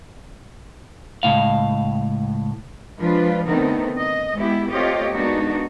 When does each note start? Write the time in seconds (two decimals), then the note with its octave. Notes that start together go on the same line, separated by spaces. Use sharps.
1.23 C#2 A2 F5
2.99 F3 G#3 D4 F4 B4
3.46 D3 D#3 A3 B3 C4 D#4
3.98 D#5
4.35 G#3 B3 E4 G4
4.72 A3 C4 F4 G4 C#5 D#5
5.14 G#3 A#3 B3 D4 D#4 F#4